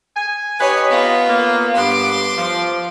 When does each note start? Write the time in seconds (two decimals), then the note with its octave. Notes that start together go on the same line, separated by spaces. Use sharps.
0.16 G#5
0.60 D#4 G4 B4 C#5 G#5
0.90 B3 F4
1.28 A#3
1.75 G2 B3 C6 D6
2.37 F3